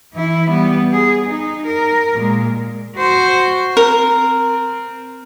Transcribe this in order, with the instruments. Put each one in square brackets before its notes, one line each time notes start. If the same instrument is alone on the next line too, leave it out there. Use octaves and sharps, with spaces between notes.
[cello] E3 E4
G3 B3
G#4
D#4
A#4
A#2 G#3
F#4 C5
[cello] C4 [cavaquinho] A#4